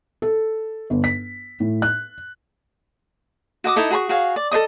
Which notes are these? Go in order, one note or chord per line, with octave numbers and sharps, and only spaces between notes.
A4
G1
B6
A2
F#6
F#4 D#5 D6 D#6
D#4 E4 A4 D#5
F#4 G#4 A#5 C#6
F#4 G#4 C#5 F5
D5
A4 C5 D#5 D#6